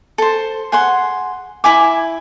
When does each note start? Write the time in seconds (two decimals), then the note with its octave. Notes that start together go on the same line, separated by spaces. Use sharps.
0.18 A4 C5
0.72 G#4 F#5 C6
1.64 E4 E5 G#5 D6